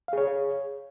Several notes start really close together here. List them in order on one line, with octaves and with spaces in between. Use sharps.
F5 G#4 C#5